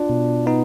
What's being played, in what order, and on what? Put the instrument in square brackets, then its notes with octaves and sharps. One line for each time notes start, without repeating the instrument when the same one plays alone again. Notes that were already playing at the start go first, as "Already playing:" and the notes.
Already playing: [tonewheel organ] D4 [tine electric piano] F4
[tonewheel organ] B2
[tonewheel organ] B3 [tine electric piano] D#4